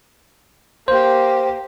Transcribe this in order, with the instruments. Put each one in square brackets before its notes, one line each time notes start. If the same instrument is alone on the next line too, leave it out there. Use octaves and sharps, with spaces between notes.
[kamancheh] A#3 G4 [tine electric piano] C5